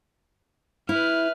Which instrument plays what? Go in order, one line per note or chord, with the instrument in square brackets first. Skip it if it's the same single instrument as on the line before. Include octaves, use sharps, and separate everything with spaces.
[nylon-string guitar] E4 [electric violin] B4 F6